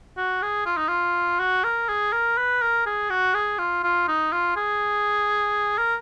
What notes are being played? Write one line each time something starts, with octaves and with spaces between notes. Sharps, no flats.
F#4
G#4
F4
D#4
F4
F#4
A#4
G#4
A#4
B4
A#4
G#4
F#4
G#4
F4
F4
D#4
F4
G#4
A#4